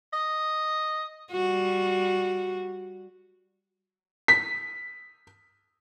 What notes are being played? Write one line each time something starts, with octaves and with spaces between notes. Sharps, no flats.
D#5
G3 F#4
B6